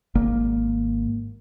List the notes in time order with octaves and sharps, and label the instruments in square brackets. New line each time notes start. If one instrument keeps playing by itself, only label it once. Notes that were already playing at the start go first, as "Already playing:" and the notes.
[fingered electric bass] G#1 A#3